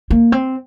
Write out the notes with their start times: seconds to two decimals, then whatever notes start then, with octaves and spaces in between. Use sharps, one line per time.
0.11 A#3
0.32 C4